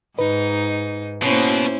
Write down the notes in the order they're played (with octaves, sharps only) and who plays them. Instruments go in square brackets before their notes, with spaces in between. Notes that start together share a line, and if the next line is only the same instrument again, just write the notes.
[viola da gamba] G#2 [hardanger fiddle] D#4 [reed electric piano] B4
[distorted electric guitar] B2 [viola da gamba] A#3 C5 [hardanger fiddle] C#4 E4